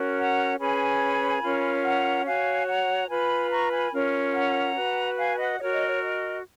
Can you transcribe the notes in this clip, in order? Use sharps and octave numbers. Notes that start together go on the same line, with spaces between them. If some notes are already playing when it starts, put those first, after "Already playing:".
Already playing: C#4 F#4 A#4
F#5 A#5
C#4 G#4 B4 G#5 B5
C#4 F4 A#4
F#5 A#5
F#4 C#5 F5 G#5
F#5 A#5
F4 B4 G#5 B5
A#5 C#6
G#5 B5
C#4 F4 A#4
F#5 A#5
F#4 B4
F5 G#5
D#5 F#5
F#4 A#4 C#5 D#5
D#5
C#5
D#5